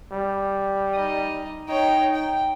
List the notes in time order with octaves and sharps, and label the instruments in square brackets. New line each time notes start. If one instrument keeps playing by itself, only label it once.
[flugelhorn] G3
[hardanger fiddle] D#4 D#5
[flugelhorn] D#4 [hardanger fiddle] C#5 G5
[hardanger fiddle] G5